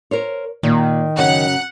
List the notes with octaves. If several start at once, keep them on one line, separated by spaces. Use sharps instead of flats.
A#4 C5 C#5
A#2 D#3
F#2 C#3 F#3 F#5 F#6